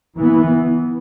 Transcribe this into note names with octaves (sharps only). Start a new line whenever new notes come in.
E3 B3